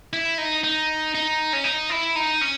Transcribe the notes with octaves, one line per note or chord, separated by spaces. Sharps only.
E4
D#4
D#4
D#4
C#4
D#4
E4
D#4
C#4